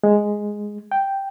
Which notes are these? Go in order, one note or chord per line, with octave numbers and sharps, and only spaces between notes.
G#3
G5